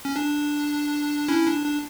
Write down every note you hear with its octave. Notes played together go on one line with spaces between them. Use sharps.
C#4
D4
C#4 E4
D4
D4